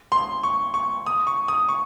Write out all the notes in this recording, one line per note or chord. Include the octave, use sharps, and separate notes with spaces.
C6
C#6
C#6
D#6
C#6
D#6
C#6